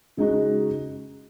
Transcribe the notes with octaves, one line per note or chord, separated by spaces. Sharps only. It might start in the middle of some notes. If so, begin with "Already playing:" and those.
C#3 G#3 D#4 F#4